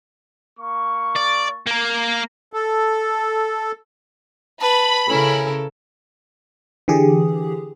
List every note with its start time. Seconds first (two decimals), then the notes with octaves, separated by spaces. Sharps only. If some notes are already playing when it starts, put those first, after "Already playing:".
0.59 A#3 C#6
1.16 D5
1.67 A#3 A#4
2.53 A4
4.61 B4 A5 B5
5.09 C#3 C#4 E4 A4 A#4
6.88 D3 E3 G4 G#4